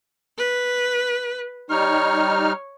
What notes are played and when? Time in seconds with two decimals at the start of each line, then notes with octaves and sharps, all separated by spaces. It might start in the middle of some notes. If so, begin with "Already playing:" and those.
0.38 B4
1.70 G3 D#4 C#5 F6